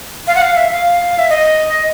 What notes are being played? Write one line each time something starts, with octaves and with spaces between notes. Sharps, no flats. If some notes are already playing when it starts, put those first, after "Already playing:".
F5
F#5
F5
E5
F5
E5
D#5